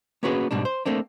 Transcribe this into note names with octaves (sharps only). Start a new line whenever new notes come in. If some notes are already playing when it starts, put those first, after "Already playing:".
A#3 B3 C#4 F#4 G#4 B4
G#2 B2 G3 D4
C5
A3 A#3 C4 D4